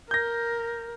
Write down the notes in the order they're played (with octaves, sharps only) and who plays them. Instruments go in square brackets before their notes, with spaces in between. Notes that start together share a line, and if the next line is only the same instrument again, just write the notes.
[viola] A#4 [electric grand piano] G6 A#6